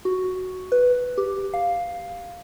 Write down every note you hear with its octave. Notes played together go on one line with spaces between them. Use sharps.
F#4
B4
G4
F5